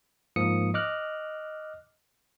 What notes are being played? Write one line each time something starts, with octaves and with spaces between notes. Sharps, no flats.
G#2 F3 A#3 D#6 C#7
D#5 D6 F6 F#6